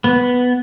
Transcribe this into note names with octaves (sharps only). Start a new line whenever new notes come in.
B3